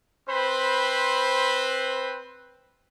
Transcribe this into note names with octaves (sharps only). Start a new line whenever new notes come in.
C4 B4 C5 B5